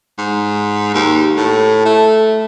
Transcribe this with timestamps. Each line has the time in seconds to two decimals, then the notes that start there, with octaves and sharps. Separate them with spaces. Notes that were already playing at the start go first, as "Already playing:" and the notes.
0.19 G#2
0.94 D#2
1.37 A2
1.85 A3